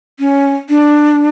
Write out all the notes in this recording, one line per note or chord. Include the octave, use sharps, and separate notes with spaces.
C#4
D4